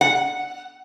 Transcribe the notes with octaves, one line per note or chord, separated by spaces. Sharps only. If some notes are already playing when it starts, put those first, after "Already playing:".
F#5